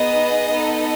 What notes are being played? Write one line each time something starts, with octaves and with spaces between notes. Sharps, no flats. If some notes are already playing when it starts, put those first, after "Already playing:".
Already playing: B3 D#4 G#4 D#5
B3 D#4 A4